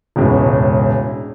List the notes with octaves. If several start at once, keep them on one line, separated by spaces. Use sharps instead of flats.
E1 C#2 A2